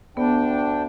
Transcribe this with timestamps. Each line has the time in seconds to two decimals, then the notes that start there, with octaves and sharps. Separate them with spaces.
0.17 D2 B3 D4 G5